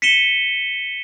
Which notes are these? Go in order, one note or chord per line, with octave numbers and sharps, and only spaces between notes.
B6 C#7 D#7 E7 G7